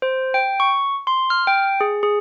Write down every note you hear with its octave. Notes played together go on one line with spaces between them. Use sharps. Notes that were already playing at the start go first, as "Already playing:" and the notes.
C5
G5
C#6
C6
F6
G5
G#4
G#4